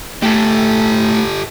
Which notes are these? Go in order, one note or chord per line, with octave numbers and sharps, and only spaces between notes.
A2 G4 A4